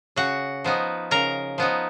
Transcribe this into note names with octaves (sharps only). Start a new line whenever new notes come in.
C#3 F#4 F#5
F3 B3 D#4
C#3 A#4 A#5
F3 B3 D#4